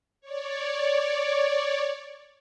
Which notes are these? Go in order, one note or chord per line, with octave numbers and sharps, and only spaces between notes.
C#5 D5